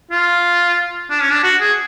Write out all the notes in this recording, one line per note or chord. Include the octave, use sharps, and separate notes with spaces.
F4
D4
C#4
D4
F#4
G#4